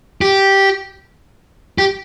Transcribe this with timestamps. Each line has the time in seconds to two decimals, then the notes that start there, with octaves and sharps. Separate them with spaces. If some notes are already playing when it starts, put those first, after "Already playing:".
0.21 G4
1.78 G4